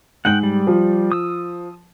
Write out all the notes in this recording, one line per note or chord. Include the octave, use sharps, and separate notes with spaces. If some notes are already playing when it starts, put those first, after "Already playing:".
G#2 F#5 G5 F#7
G3
F3
D#6 E6